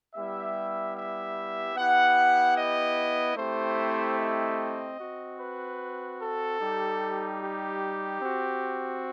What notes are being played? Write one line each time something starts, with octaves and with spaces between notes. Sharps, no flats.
G3 B3 E4 G4 E5
E5
B3 E4 G4 F#5
D#5
A3 C4 E4 G4 C5
D#5
C4 F#4
B4
A4
G3 D#4 G4
G4
C4 F#4